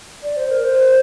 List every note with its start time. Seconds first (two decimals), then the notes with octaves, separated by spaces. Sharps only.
0.23 D5
0.37 C5
0.51 A#4
0.64 C5